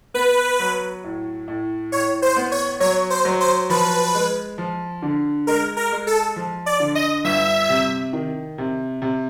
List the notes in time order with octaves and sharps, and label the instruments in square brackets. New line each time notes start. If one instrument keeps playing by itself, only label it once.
[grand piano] B3 [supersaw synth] B4
[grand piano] F#3
A2
A2
[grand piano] A2 [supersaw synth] C#5
[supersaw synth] C5
[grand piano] B3
[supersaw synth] C#5
[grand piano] F#3 [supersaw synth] C#5
[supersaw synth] C5
[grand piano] F#3
[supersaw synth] C5
[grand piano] F3 [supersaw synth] B4
[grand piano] G#3
F3
D3
[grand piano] G#3 [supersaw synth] A#4
[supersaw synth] A#4
[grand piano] G#3
[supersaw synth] A4
[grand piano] F3
[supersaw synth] D5
[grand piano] D3
[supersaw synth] D#5
[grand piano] G1 [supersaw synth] E5
[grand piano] C3
D#3
C3
C3